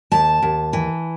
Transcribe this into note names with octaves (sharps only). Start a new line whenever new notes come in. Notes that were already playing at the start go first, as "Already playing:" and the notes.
D#2 A5
D#2
E3